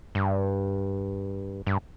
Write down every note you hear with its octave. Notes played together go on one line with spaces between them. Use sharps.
G2
G2